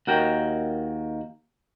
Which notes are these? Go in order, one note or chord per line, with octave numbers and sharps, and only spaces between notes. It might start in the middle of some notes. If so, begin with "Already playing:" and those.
D#2 F#4 A#4 G5